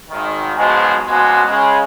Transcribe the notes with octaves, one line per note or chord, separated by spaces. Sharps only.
G#1 D#3
G#2 B2 F3 F#3 G#3
C#2 B2 F3 G#3 A#3 F#4
C#3 G#3